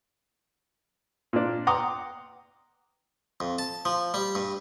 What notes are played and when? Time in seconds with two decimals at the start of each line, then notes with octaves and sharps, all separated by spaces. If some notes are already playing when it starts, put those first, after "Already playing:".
1.33 A#2 D4
1.67 F#5 G5 A#5 C6 D6 D#6
3.40 F2
3.59 A5
3.85 F3
4.14 G3
4.35 G2